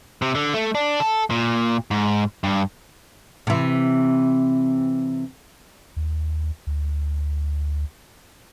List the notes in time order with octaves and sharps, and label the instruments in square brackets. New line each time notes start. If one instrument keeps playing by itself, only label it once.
[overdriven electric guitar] C3
D3
A3
D4
A4
A#2
G#2
G2
[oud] C3 E3
[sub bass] D#2
D2